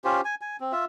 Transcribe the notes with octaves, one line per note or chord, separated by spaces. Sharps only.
C#4 F4 G4 C5
G#5
G#5
C4
F4 E5